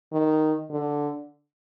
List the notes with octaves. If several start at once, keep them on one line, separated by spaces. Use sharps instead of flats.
D#3
D3